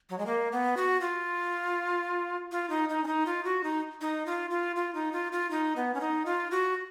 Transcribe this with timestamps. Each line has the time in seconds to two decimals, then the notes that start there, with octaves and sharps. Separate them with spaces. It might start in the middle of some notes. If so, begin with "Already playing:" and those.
0.10 F#3
0.18 G#3
0.26 A#3
0.52 B3
0.77 F#4
1.01 F4
2.52 F4
2.70 D#4
2.89 D#4
3.04 C#4
3.07 D#4
3.26 F4
3.45 F#4
3.64 D#4
4.01 D#4
4.26 F4
4.51 F4
4.76 F4
4.95 D#4
5.13 F4
5.32 F4
5.51 D#4
5.76 B3
5.94 C#4
6.01 D#4
6.26 F4
6.51 F#4